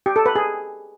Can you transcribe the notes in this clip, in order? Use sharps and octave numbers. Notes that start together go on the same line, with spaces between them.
G4
A4
B4
G#4